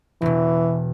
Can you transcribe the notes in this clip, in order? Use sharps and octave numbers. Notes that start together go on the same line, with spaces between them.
E1 B2 E3